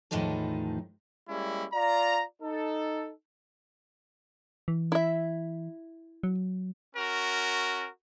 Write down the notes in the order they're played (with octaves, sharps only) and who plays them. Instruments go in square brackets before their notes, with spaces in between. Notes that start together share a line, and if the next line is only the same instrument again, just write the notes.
[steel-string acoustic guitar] E2 A2 D#3 F3 D#4 A4
[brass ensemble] G3 G#3 A#3 C#4 E4
F4 D5 A#5
D#4 A4
[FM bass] E3
[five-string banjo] E4 E5
[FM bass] F#3
[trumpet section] C#4 F#4 A#4